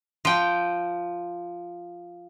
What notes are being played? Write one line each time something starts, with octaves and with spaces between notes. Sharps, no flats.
F3 G5